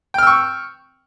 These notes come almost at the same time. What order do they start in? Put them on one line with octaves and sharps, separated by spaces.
G5 F6 E6 C#6